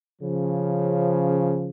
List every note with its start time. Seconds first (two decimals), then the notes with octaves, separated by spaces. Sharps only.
0.22 C#3 F3